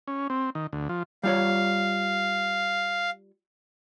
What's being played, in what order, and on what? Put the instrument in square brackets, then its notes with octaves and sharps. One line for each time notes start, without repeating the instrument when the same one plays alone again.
[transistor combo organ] C#4
C4
D#3
D2
F3
[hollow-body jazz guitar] G3 F4 C#5 [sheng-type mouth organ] F5